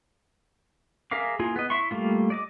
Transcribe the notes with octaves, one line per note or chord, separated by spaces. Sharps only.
G#4 A#4 E5 F5 D6
A#3 E4 F4 G#4
B3 D#5
E4 E5 C6 C#6
G3 A3 A#3 F4
D5 D#5 D6